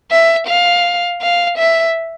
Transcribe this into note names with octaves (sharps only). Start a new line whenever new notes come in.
E5
F5
F5
E5